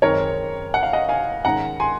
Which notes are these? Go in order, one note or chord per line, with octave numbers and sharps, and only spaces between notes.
F#2 D#3 G#3 C4 D#4 A#4 C#5
F#5
F5
D#5 F#5
F5 G#5
G#2 D#3 G#3 C#4 F#5 A#5
G#5 C6